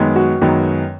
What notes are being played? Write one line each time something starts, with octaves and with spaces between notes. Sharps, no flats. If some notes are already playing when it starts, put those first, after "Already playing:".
Already playing: F#2 D#3 G#3 B3
F#4
F#2 D#3 G#3 B3